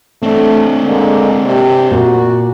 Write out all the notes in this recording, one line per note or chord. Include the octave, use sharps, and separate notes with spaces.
A3 C4 D4
D3 G#3 A#3
C3 D5
A#2 F#4